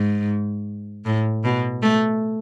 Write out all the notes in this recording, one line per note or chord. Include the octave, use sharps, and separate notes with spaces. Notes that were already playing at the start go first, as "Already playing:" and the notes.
Already playing: G#2
A2
B2
A3